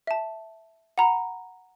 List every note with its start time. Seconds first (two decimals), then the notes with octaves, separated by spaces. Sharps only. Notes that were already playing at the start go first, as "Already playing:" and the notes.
0.07 E5 A5
0.98 F#5 A#5 B5